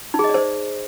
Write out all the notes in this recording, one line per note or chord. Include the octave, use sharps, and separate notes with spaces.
D#4
G#4
D#5
D5
C5